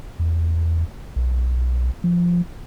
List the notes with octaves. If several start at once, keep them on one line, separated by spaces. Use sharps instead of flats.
E2
B1
F3